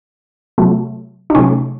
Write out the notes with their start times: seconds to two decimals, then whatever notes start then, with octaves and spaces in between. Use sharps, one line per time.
0.58 C3 F#3 A3
1.30 D#4
1.35 C3 F#3 A3 C#4